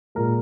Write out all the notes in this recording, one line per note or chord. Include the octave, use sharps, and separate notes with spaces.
A#2 G#3 A#4